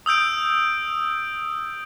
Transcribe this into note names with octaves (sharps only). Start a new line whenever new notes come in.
D#6 E6 G6 D7